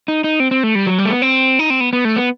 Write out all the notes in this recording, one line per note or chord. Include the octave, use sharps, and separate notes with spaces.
D#4
D#4
C4
C4
A3
G3
F#3
G3
A3
B3
C4
D#4
C4
B3
B3
A3
B3